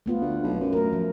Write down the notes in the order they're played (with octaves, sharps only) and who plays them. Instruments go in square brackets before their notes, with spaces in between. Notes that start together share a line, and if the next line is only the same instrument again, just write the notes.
[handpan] A3 B3 F4
[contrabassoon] D2
B1
F#2
[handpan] A3 A#4
F3